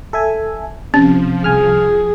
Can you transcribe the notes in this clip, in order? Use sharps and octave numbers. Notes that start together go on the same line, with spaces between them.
A4 E5 G#5
C3 F3 C#4
C2 G#4 G#5 F6